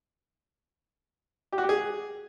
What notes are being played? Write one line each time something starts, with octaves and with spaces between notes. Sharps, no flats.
G4
F#4
G4
G#4